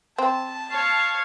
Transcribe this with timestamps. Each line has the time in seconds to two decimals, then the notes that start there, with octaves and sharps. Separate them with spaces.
0.18 C4 A5
0.70 C#5 F5